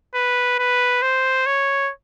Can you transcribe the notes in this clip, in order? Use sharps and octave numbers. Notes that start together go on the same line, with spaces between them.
B4
B4
C5
C#5